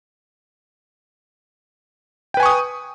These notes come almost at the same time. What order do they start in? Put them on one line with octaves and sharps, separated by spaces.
G5 B4 G#5 C#6 D#6